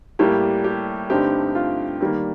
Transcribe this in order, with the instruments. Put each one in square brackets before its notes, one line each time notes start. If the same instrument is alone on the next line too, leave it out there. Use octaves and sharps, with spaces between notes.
[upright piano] A2 G3 A#3 G4
G4
G2 D3 A3 C4 D#4 G4
F4
D#3 G3 A#3